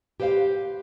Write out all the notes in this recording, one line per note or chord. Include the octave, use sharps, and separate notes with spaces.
G4 B4 C5 E5 F5